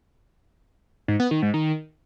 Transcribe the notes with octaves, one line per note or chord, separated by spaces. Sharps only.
G#2
B3
D#3
G#2
D#3